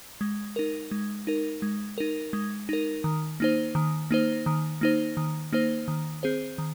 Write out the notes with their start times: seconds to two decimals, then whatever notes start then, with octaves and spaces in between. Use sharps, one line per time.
0.21 G#3
0.56 D#4 A#4
0.91 G#3
1.27 D#4 A#4
1.62 G#3
1.98 D#4 A#4
2.33 G#3
2.69 D#4 A#4
3.04 D#3
3.40 A#3 D#4 C5
3.75 D#3
4.11 A#3 D#4 C5
4.46 D#3
4.81 A#3 D#4 C5
5.17 D#3
5.53 A#3 D#4 C5
5.88 D#3
6.23 C4 G#4 C5
6.58 D#3